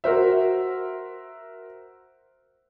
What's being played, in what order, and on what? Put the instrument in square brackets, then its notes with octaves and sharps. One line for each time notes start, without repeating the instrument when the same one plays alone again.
[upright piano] F#4 A#4 C5 E5